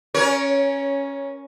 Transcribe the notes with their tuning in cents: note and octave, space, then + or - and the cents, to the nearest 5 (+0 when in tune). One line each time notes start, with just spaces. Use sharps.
C#4 +0 A#4 +25 C#5 +10